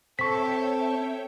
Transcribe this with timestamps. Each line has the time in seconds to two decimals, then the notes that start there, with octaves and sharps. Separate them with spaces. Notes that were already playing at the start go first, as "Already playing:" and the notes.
0.19 C4 A4 C#5 E5 G5 C#6 B6